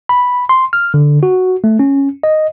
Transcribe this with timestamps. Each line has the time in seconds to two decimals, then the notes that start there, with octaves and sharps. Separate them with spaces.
0.09 B5
0.49 C6
0.73 F6
0.94 D3
1.23 F#4
1.64 A3
1.79 C#4
2.23 D#5